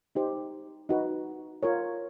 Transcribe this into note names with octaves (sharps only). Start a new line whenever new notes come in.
D#4 G4 C5
D#4 F#4 B4
F4 A#4 C#5